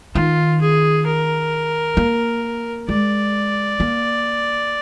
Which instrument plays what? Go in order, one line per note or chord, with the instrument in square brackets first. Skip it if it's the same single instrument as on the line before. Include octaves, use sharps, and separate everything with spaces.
[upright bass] D#3 [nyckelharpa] F4
[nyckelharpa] G#4
A#4
[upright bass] A#3
[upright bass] G#3 [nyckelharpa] D5
[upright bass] A#3